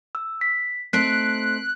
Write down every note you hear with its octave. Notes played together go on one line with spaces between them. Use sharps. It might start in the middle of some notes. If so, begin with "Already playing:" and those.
E6
B6
A3 C4 D#4 F#6 B6 C7 D7